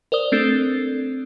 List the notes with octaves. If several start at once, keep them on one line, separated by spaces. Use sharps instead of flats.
A#4 C5 D5 D#6 G7
A3 C4 D4 A4